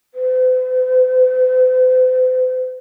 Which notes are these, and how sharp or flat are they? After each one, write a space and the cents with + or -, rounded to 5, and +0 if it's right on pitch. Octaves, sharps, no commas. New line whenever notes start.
C5 -45